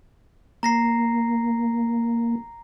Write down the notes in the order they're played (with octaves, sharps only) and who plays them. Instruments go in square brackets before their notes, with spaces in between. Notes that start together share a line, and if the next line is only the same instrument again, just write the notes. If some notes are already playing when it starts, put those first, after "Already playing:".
[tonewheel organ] A#3 [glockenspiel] A#5 A#6 C7